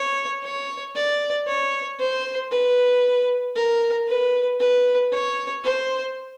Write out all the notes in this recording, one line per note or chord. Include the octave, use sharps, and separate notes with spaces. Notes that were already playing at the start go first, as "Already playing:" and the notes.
Already playing: C#5
C#5
D5
C#5
C5
B4
A#4
B4
B4
C#5
C5